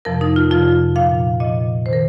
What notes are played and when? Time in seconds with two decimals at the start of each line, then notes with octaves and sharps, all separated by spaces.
0.05 F2 C3 F3 A#4
0.21 D#4
0.36 F4
0.51 F2 C3 F3 F4
0.96 A#2 F3 F5
1.40 A#2 F3 D#5
1.86 D#3 C5
1.93 A#4